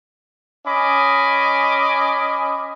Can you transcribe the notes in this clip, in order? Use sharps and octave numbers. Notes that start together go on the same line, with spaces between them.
C#4 D#5 G#5 B5 D6